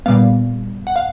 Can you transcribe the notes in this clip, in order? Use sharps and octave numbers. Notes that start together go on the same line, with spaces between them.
A#2 G3 B3 F5
F#5
F5